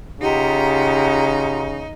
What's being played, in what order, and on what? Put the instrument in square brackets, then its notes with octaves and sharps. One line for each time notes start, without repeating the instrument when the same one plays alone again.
[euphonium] C#3 [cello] D#4 [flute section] F4 F#5 A#5 [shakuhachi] G4